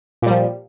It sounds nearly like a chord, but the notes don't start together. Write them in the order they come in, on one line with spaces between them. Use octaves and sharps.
A#2 G3 F3